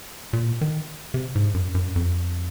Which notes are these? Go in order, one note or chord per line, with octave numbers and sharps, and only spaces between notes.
A#2
D#3
C3
G#2
F#2
F#2
F2